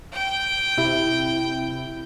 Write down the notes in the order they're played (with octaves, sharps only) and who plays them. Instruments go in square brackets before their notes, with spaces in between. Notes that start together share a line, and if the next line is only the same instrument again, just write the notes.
[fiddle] G5
[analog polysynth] C3 E4